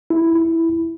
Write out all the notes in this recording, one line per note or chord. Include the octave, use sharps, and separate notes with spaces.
E4
E4